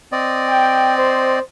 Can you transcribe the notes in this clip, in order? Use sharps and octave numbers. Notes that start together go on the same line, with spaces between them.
C4 D5 D#5
G5
C5